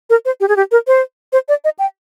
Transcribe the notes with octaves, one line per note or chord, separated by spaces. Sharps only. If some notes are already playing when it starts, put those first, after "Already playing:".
A#4
C5
G4
G#4
G4
A#4
C5
C5
D5
D#5
G5